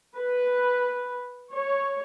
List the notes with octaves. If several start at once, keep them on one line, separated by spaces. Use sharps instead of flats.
B4
C#5